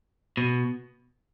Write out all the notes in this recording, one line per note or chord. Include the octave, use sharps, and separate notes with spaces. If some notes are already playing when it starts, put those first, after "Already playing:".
B2